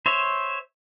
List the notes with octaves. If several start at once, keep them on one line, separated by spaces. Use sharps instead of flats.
C5 C#5 E5